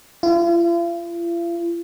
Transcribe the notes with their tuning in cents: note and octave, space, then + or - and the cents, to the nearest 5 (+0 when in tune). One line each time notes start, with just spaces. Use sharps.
F4 -45